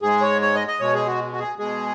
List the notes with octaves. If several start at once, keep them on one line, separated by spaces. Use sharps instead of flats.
G#2 G#3 G#4
C#5
C#5
D#5
D#5
B2 G#3 C#5
G#4
F#4
F#4
G#4
B2 G#3 G#4